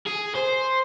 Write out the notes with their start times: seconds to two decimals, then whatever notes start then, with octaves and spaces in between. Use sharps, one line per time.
0.07 G#4
0.35 C5